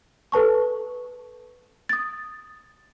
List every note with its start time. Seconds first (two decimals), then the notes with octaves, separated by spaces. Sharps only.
0.32 A4 B4 A5 C#6
1.89 D#6 A6